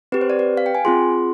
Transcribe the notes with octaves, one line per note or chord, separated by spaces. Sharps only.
C4 G4 B4
C5
D5
B4
F5
G5
G#5
C4 F4 G#4 C6